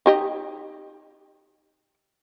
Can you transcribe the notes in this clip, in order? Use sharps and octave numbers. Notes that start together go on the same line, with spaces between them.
D#4 G4 D#5